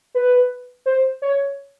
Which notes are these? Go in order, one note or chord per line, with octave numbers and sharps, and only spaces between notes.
B4
C5
C#5